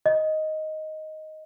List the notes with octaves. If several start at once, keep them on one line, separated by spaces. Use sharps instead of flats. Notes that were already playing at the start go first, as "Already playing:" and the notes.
D#5